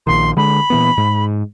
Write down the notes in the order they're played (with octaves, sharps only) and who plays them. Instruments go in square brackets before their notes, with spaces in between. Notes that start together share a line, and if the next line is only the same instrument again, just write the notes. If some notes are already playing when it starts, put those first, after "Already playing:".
[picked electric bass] A#1 A#2 D#3 [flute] C6
[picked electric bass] D3 G#3 [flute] B5
[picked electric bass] A#2 E3 B3
G#2